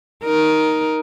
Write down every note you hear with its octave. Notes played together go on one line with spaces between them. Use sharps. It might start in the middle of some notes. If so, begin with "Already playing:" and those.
D#4 A#4